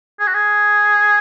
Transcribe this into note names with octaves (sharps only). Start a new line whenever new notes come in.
G#4
F#4
G#4